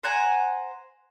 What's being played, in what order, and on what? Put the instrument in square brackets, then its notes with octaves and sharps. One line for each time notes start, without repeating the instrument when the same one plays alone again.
[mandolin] C5 F#5 G#5 A#5